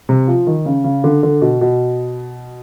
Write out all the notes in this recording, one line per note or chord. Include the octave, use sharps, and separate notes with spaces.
C3
F3
D#3
C#3
C#3
D3
D3
B2
B2